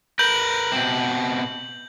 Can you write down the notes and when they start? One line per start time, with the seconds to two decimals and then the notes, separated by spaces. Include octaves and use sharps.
0.19 A#4 B4 G6 F#7
0.72 B2 C4